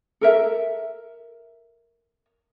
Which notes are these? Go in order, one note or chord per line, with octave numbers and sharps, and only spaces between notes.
A4 A#4 E5